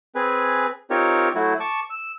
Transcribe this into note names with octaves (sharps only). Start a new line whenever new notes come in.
C4 G#4 B4 G#5
C4 D#4 F4 G4 A#4 C#5
F#3 A3 E4 F#4
A5 C#6 D6
E6